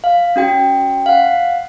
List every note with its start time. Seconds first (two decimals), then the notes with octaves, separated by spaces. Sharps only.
0.04 F5
0.36 C#4 F#4 G5
1.06 F5 F#5